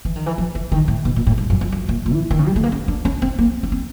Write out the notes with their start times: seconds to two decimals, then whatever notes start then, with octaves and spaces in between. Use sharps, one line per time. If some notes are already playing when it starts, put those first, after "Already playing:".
0.05 E3
0.16 D#3
0.26 E3
0.38 F3
0.55 E3
0.72 D#3
0.88 A2
1.05 B2
1.16 A#2
1.27 A2
1.38 G2
1.50 F#2
1.61 F2
1.72 F#2
1.89 A#2
2.06 A#2
2.13 E3
2.31 D#3
2.39 C#3
2.47 G3
2.56 A3
2.63 A#3
2.72 C#4
2.88 D4
3.05 C#4
3.22 C4
3.39 A#3
3.63 C#4
3.72 C4